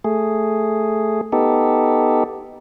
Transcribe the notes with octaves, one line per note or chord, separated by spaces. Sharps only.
A3 G#4
B3 D#4 G4 A4